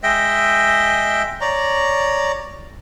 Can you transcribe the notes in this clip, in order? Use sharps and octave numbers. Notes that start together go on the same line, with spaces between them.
G#3 D#5 E5 G5
C#5 D5 A#5